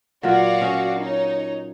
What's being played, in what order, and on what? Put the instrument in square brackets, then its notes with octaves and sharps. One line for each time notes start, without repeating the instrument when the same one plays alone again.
[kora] A#2 F#3 F4 [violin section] F#4 D5 F5
[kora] C#4 D#5
[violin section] D#4 C#5